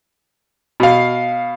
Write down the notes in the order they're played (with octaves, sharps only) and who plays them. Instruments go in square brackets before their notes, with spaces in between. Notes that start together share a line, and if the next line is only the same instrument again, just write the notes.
[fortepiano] B2 F5